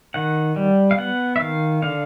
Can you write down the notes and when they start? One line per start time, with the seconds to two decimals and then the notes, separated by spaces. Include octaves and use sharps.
0.14 D#3 F#5
0.56 G3
0.91 F5
0.98 B3 F#5
1.36 E5
1.39 D#3 F5
1.82 D3 F5